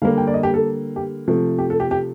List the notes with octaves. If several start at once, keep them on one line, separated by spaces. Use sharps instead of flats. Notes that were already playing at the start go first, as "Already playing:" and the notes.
D3 G3 A#3 F5
G5
D5
D#5
G4
A4
G4
C3 F3 A3
G4
A4
G4
G4